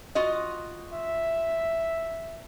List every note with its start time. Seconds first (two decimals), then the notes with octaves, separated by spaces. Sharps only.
0.15 F4 F#4 D#5
0.93 E5